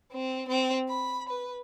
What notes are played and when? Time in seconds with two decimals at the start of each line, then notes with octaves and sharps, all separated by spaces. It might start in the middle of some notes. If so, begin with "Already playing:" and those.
0.11 C4
0.48 C4
0.89 B5
1.28 B4